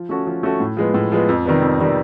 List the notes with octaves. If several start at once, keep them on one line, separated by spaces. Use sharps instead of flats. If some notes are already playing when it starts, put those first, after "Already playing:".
Already playing: F3
A3 C#4 F#4 A4
F3
A3 C#4 F#4 A4
A2
F3 G#3 B3
A2
F3 G#3 B3
F2
C3 D#3 G3 B3
F2
C3 D#3 G3 B3